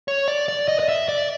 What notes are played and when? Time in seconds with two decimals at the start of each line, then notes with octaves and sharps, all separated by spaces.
0.08 C#5
0.28 D5
0.48 D5
0.68 D#5
0.80 D#5
0.89 E5
1.09 D5